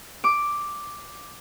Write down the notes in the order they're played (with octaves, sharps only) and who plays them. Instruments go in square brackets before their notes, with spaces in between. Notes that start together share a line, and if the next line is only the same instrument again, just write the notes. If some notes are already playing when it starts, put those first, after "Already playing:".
[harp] D6